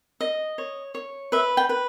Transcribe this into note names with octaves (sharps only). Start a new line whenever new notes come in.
D#5
C#5
C#5
B4 E5
G5
B4